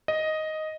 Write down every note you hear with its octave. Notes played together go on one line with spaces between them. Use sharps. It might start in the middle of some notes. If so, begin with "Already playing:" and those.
D#5